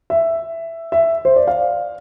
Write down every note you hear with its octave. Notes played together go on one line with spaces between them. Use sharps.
E5
E5
C5
D5
F5